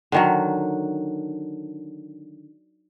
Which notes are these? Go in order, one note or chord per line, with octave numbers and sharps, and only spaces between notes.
D3 D#3 F#3